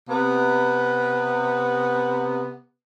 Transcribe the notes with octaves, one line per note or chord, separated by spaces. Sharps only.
C3 B3